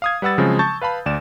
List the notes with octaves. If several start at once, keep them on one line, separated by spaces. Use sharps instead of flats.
F5 D#6 G#6
G3 B4 F#5 E6 A6
C#3 F3 F#3 G#3 C4
A5 C#6 G6 A6
B4 F5 A5 B5
D2 D5 E7